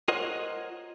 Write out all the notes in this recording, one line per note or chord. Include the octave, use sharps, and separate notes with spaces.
F4 A#4 C5 C#5 D#5 F#5